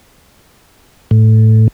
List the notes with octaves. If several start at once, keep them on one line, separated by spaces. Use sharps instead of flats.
A2